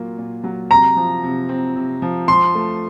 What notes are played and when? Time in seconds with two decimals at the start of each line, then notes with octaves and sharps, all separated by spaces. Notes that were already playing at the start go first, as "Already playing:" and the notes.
Already playing: A#2 F#3 A#3 F4
0.18 A#2
0.44 F#3
0.70 C3 A#5
0.97 F3
1.24 C3
1.49 C4
1.76 C3
2.02 F3
2.28 F3 C6
2.55 A3